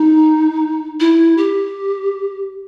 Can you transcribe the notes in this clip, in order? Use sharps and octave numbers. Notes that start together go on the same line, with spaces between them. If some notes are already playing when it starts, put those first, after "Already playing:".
Already playing: D#4
E4
G4